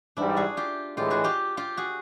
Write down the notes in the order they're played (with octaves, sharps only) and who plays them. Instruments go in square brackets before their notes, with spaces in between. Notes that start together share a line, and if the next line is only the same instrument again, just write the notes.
[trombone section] G#2 E3 G3 [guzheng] D4 E4
[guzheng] F#4 G#4
F4 G4
[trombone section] A2 E3 G#3 [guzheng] F4 G4
[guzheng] F#4 G#4
F4 G4
F4 G4
F#4 G#4